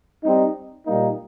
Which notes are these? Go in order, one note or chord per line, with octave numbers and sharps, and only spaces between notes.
G3 C4 D#4
A#2 G3 A#3 D#4